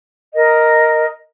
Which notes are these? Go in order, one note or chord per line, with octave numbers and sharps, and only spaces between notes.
A#4 D#5